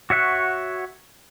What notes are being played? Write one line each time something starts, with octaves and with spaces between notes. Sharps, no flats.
F#4 C#5 E5 F#5